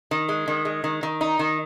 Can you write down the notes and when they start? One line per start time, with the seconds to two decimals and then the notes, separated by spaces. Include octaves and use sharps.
0.11 D#3
0.29 G#3
0.48 D#3
0.65 G#3
0.84 D#3
1.03 D#3
1.21 D#4
1.39 D#3